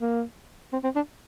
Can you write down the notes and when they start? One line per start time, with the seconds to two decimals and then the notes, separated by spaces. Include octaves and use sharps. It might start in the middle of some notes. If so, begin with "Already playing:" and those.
0.01 A#3
0.73 C4
0.84 C4
0.96 D4